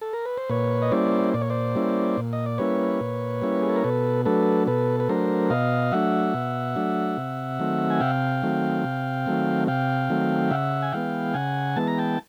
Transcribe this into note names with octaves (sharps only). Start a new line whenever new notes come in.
A4
A#4
B4
C5
A#2 B4 C#5
D#5
G3 A#3 C#4 E4 C5 D5
A#2 D5
C#5
C5 D5
G3 A#3 C#4 E4
A#2
D#5
D5
G3 A#3 C#4 E4 B4 C#5
A#2
G3 A#3 C#4 E4
G#4
A4
A#4
B2 A4 B4
F#3 A3 D4 A4 B4
B2 A4 B4
B4
F#3 A3 D4 A#4 C5
B2 D#5 F5
F#3 A3 D4 E5 F#5
B2
F#3 A3 D4
C3
D#3 F#3 A3 C4
G#5
C3 F5 G5
D#3 F#3 A3 C4
C3
D#3 F#3 A3 C4
C3 F5 G5
D#3 F#3 A3 C4
C#3 E5 F#5
G#5
E3 G#3 B3 F5 G5
C#3 F#5 G#5
E3 G#3 B3 A5
A#5
G5 A5